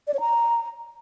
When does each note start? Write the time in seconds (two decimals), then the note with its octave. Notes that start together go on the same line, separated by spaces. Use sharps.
0.08 D5
0.14 C#5
0.20 A#5